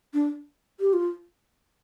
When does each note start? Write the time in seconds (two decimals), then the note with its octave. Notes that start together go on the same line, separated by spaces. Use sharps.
0.14 D4
0.80 G4
0.93 F4